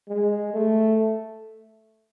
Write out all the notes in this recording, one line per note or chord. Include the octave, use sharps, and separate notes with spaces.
G#3
A3